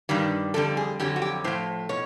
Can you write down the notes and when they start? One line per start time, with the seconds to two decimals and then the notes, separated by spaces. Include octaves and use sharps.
0.09 G2 D#3 G3
0.54 F2 D3 G3 A4
0.77 G#4
1.00 F2 D3 F#3 G4
1.16 F#4
1.22 G4
1.44 A2 F3 C5
1.89 B2 C#5